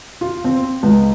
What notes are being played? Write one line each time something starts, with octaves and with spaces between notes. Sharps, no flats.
F4
C4
C#2